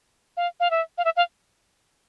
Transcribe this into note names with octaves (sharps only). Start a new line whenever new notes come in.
F5
F5
E5
F5
E5
F5